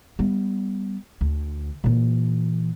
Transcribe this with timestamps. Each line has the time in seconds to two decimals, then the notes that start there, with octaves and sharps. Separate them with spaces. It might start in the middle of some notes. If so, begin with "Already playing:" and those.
0.19 G3 B3
1.21 D2
1.84 A#2 E3